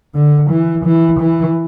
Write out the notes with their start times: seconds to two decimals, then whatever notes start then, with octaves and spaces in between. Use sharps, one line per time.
0.14 D3
0.50 E3
0.85 E3
1.20 E3